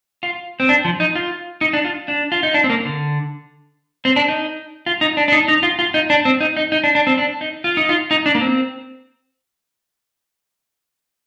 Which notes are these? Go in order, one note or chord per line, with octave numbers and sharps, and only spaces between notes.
F4
C4
D4
F3
D#4
F4
D#4
D4
F4
D4
F4
D#4
D4
C4
A#3
D3
C4
D4
D#4
F4
D#4
D4
D4
D#4
D#4
F4
F4
D#4
D4
C4
D#4
D#4
D#4
D4
D4
C4
D4
D#4
F4
D#4
F4
D#4
D4
A#3
C4